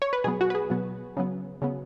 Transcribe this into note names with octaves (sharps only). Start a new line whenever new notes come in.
C#5
B4
B2 F#3 B3 G#4
F#4
B4
G#4
B2 F#3 B3
C#3 F#3 B3
C#3 F#3 B3